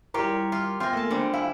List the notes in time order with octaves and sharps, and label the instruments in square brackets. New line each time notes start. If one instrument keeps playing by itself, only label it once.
[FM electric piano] G3 A#4 [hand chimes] E4 [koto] F4 G4 C#5
[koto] F4 [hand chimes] D6 F6
[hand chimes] B3 E5 A#6 [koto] F4 G#5 [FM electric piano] C5 G5
[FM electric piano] A3 A#3 [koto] A4 A5
[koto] D3 G3 [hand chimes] D4 C5
[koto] E4 [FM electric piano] F4 [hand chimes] F5 G#5